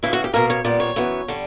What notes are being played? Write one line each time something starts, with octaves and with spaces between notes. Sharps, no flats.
D2 C#3 E3 E4
F#4
G4
B2 A#3 A#4
C#5
A#2 G3 B3 D5
C#5
F#2 E3 B3
D3 G3